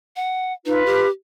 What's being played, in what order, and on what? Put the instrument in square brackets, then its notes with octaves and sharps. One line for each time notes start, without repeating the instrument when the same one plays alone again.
[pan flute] F#5
[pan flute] D#4 [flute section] F4 B4
[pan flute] G4